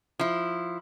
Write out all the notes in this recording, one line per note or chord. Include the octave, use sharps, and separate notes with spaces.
F3 E4